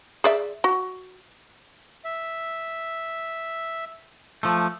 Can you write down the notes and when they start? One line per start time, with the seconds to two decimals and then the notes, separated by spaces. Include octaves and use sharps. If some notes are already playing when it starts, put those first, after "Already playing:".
0.24 G#4 D5 E5
0.64 F#4
2.04 E5
4.43 F3 A3